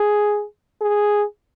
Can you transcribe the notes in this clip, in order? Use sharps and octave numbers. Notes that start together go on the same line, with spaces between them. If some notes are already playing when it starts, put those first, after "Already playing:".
Already playing: G#4
G#4